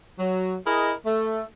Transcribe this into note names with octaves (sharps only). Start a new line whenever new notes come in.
F#3
E4 G#4 A#4 D#5
A3